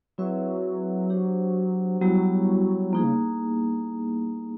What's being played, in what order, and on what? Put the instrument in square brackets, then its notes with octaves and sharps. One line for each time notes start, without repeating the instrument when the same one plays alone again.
[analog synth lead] F#3 [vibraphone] C4 E4 G#4 B4 E5
[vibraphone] D4 G4 C5
[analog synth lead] F#3 [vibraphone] G3 B3 E4 G4
[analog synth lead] F3 [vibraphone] A#3 D#4 G#4
[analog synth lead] C#3